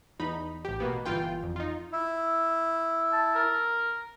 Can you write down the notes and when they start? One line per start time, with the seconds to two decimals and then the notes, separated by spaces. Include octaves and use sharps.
0.19 E2 D#4 B5
0.65 A1 G4
0.80 B2 A#3 B3
1.05 G1 E3 F4 G5
1.43 F2
1.56 D#4 F4
1.92 E4
3.12 A5
3.35 A#4